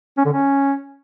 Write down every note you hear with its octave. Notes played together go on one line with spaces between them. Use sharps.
C#4
D3
C#4